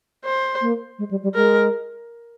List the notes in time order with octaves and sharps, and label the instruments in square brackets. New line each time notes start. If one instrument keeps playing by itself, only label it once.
[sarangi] C5
[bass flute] A#3
G#3
G3
G3
[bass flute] G#3 [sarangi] A#4